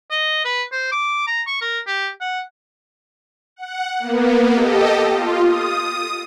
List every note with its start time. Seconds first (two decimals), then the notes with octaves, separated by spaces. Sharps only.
0.10 D#5
0.45 B4
0.72 C5
0.91 D6
1.27 A#5
1.47 C#6
1.61 A#4
1.87 G4
2.21 F#5
3.56 F#5
3.99 A#3 B3
4.55 G4 A4 D#5
5.11 F4
5.42 D#6